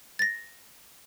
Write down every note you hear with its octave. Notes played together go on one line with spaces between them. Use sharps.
A6 A#6